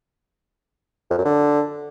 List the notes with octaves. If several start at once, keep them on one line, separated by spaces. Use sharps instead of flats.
F2
F#2
D3